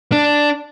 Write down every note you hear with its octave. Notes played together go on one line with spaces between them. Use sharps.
D4